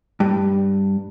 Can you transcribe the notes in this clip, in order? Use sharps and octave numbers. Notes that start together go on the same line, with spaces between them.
G2